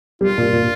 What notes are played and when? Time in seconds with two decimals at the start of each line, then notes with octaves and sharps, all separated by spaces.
0.21 G3 F4
0.38 A#2
0.53 A#2